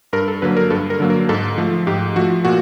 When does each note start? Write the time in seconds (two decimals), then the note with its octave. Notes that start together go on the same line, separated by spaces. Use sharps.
0.13 G2 A#4
0.28 A4
0.42 D3 F#3 A#3 B4
0.57 A#4
0.70 G2 A4
0.90 A#4
1.00 D3 F#3 A#3
1.10 A#4
1.29 G#2 A4
1.58 F3 A3
1.87 G#2 G4
2.16 F3 A3 F#4
2.45 A#2 F#4